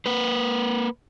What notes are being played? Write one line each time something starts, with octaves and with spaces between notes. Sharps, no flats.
A#3 B4